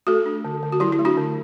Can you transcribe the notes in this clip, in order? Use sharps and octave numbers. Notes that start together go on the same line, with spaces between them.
A3 F#4 A4
D4
D3
D3
F#4
F#3 E4 G4
E4
A3
D4 F#4
D3